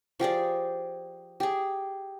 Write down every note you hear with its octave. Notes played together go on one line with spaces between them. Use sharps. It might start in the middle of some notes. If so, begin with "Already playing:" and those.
F3 G4 G#4 D5
G4 G#4